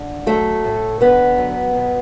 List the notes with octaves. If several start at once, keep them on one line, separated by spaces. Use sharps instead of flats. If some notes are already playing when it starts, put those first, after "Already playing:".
Already playing: D3
F#3 A3 A4
A2
D3 B3 B4
F#3
B2